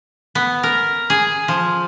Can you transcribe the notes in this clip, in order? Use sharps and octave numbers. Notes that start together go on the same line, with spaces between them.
B3
A#4
G#4
F3